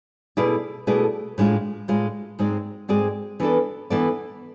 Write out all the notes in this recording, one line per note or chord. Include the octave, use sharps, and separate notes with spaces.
B2 A3 E4 G#4 D5
B2 A3 E4 G#4 D5
A2 G#3 D4 F4
A2 G#3 D4 F4
G#2 G#3 C4 G#4 D5
G#2 G#3 C4 G#4 D5
E3 B3 D4 A4 D5
E3 B3 D4 A4 D5